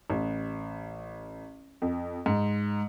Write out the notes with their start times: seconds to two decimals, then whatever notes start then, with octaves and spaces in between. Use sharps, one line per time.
0.10 A1
1.82 F2
2.26 G#2